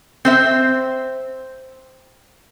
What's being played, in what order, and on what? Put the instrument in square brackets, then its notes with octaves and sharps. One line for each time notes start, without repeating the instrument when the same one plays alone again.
[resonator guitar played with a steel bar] C4 C5 E5